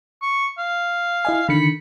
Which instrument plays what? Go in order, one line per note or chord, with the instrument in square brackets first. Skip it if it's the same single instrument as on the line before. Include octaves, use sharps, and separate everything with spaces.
[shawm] C#6
F5
[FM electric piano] E4 D#5 G#5
[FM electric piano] D3 D#3 C#7 [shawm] B5